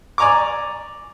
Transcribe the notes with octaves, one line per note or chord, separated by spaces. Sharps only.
D5 G#5 A#5 C#6 D6